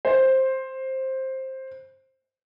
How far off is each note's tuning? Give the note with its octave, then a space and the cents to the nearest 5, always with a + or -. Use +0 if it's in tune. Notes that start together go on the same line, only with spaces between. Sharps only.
C5 +10